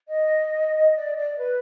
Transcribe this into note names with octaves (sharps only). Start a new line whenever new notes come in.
D#5
D5
D5
B4